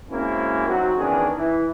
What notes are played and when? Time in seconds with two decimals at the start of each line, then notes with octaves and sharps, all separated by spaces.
0.10 G#3 A#3 C4 C#4 E4 F#4
0.67 F#3 C4 D#4 F#4
0.97 D#3 E3 B3 C#4 D4 G#4
1.36 E3